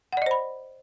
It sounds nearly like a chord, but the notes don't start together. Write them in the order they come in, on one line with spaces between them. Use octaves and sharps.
F#5 D5 D#5 C5 B5